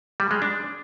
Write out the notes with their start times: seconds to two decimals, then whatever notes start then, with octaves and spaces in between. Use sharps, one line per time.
0.20 G3
0.31 G#3
0.42 D4